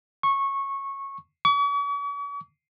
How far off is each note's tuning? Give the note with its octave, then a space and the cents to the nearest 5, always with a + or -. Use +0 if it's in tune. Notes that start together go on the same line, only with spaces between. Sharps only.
C#6 -15
C#6 +45